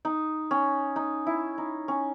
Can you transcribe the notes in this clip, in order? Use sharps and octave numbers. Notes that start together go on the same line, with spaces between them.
D#4
C#4
D#4
E4
D#4
C#4